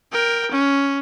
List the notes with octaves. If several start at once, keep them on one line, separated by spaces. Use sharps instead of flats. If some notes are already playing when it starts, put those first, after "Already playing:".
A#4 G5
C#4